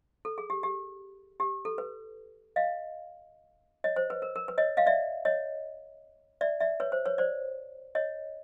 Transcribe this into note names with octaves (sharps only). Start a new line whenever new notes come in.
A4
G#4
G4
G4
G4
A4
B4
D#5 F5
C#5 D#5
C5
B4
A#4
A#4
B4
C#5 D#5
D#5 F5
D5 E5
C#5 D#5
D5 E5
D5 E5
B4 C#5
C5
B4 C#5
C5 D5
C#5 D#5